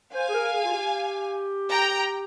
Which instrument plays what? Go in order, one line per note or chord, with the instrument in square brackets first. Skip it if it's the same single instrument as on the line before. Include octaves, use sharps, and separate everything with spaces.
[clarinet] C5 [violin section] F5 G#5
[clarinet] G#4
A#4
G#4
F4
G4
[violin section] G5 A#5